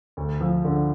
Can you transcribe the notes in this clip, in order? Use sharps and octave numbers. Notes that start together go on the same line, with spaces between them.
D2
F3
D3